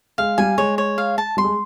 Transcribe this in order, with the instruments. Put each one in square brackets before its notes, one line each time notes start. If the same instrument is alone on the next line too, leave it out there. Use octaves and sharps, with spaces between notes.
[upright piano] G#3 [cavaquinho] F5
[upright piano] G3 [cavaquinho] G#5
[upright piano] G#3 [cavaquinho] C#5
[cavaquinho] C#5
F5
A5
[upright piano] G3 [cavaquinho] C6
[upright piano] G#3